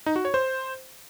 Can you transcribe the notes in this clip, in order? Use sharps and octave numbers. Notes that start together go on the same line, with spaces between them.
D#4
F#4
C#5
C5